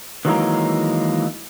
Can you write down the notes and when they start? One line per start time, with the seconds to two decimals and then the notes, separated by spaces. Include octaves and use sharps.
0.25 D#3 E3 F#3 G#3 A#3 D#4